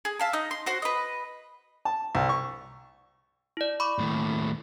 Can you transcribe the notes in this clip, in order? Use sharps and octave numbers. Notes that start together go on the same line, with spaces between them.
G#4
E5 F5 A5
D#4 D#5
C6
F#4 C5 C6
B4 D#5
A5
C2
C#6
E4 D5
B5 C#6 D6
D#2 A2